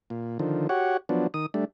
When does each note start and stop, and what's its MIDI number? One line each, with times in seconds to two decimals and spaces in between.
0.10 0.38 46
0.39 0.67 50
0.39 0.67 51
0.39 0.67 53
0.69 0.97 66
0.69 0.97 67
0.69 0.97 73
0.69 0.97 78
1.09 1.27 53
1.09 1.27 54
1.09 1.27 59
1.09 1.27 62
1.34 1.46 51
1.34 1.46 87
1.54 1.65 55
1.54 1.65 57
1.54 1.65 62